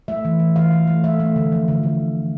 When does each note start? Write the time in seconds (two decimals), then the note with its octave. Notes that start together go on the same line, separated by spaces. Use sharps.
0.08 A3 E5
0.25 E3
0.40 E3
0.56 E3 F5
0.72 E3
0.87 A3
1.04 A3 E5
1.20 A3
1.36 D3
1.52 F3
1.68 D3
1.83 D3